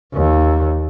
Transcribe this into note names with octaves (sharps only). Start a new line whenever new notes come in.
D#2